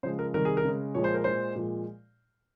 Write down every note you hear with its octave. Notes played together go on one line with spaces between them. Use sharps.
C#3 F3 G#3 C5
A#4
C3 D#3 G3 A#4
G#4
A#4
C#3 G#3
A#2 F3 G#3 C#5
C5
A#4
A#2 G#3 C5
A#2 F3 G#3